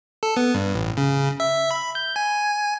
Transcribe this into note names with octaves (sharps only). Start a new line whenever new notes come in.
A4
B3
G2
A1
C#3
E5
B5
G6
G#5